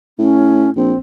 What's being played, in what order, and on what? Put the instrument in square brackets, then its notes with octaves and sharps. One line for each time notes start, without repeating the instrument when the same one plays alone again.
[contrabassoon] A2 [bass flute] C#4
[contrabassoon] A#1 [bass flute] C4